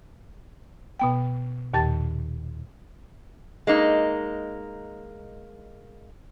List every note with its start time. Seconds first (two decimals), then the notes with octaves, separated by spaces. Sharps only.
1.00 B2 B3 G5
1.74 D#2 A#2 D#3 G4 A5 A6
3.67 G#3 A#3 D#4